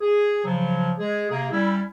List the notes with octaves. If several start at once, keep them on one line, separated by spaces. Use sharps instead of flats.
G#4
C#3 F3 F#3
G#3 G#4
C3 A#3 G#4
G3 C#4 E4